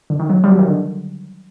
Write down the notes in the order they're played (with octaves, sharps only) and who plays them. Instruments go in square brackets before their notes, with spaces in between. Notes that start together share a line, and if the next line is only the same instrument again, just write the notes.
[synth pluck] D3
D#3
F#3
G3
F#3
D#3
D3